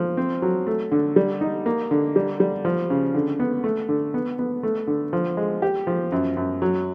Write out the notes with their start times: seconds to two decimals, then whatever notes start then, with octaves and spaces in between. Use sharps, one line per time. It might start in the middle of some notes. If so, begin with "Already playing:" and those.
Already playing: F3
0.17 C4
0.42 F#3
0.67 A3
0.92 D3
1.16 G3
1.41 D#4
1.66 A#3
1.91 D3
2.16 G3
2.40 G3
2.65 F3
2.90 C#3
3.15 D3
3.39 B3
3.64 A3
3.89 D3
4.14 B3
4.39 B3
4.63 A3
4.87 D3
5.13 F3
5.37 G#3
5.62 G4
5.87 F3
6.12 F#2
6.37 F#2
6.62 F#3